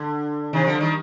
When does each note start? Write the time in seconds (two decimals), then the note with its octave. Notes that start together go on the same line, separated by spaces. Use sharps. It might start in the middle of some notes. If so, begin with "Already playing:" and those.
Already playing: D3
0.53 C3 D#3
0.66 D3 F3
0.80 D#3 G3